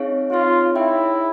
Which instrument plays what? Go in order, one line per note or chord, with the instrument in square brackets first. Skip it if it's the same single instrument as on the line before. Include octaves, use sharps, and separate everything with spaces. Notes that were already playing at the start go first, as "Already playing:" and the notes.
Already playing: [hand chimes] C4 D#4 G#4 C#5 F5
[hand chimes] C4 D#4 G#4 C#5 F5 [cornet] F4
[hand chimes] D#4 G#4 C#5 E5 G5 [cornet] E4